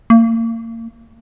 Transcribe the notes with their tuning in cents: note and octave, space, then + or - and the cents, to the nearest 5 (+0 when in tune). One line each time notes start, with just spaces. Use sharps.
A#3 -35